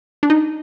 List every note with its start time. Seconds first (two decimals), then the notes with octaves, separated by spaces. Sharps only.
0.23 D4
0.30 D#4